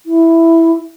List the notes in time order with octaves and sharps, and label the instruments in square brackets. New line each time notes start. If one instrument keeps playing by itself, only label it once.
[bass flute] E4